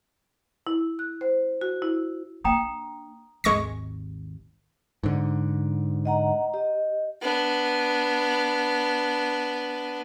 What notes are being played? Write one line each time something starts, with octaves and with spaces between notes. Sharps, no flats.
E4
F#6
C5
F#4
E4
A#3 D4 G5 A#5 D#6
G#1 D#2 G#3 C#6 A#6
G#2 D3
D#5 F#5 A#5
G4 D#5
B3 D4